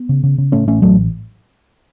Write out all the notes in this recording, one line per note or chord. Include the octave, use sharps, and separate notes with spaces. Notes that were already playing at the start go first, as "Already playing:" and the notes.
Already playing: B3
C#3
C#3
C#3
A2 A3 C#4
A1 A3 C#4
A1 F#3 A3